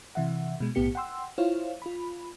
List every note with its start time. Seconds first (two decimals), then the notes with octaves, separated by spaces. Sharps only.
0.15 C3 E3 E5 F#5
0.60 B2 G#3
0.75 B1 A2 B3 G4 C#7
0.95 F#5 G5 C6 E6
1.38 E4 F4 C5 C#5 F5
1.82 F4 B5